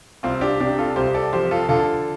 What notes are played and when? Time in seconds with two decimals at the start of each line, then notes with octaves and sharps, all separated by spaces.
0.23 C2 C4 F4
0.41 D4 G4
0.60 C3 D4 G4
0.78 F4 A4
0.96 C2 G4 C5
1.14 A4 D5
1.33 F3 G4 C5
1.51 F4 A4
1.69 D3 F4 A4